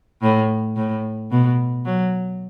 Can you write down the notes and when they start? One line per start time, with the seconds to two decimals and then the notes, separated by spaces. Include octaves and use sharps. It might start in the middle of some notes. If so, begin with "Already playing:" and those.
0.22 A2
0.76 A2
1.31 B2
1.85 F#3